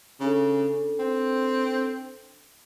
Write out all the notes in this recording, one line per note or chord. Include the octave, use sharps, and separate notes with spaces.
C#3 D4 A4
C4